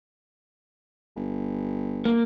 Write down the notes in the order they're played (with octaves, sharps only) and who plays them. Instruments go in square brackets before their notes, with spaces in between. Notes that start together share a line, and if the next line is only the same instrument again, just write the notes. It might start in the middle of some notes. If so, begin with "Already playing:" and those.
[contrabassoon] G1
[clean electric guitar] A#3